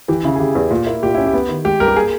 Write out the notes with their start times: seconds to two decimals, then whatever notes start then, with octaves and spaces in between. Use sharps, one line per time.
0.08 E3 G4
0.24 C#3 E4
0.35 G#4
0.40 C#3 G4
0.55 E2
0.71 A#2 G4
0.86 A#3 E4
1.02 A#2 G4
1.14 C#4 E4
1.27 G4
1.34 B3
1.49 D#3
1.64 G#3 G4
1.80 G2 A#4
1.88 G4
1.96 A#3 G#4